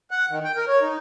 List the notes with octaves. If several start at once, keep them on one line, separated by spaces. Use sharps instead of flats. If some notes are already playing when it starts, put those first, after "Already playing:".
F#5
D#3
G5
A#4
C#5
D#4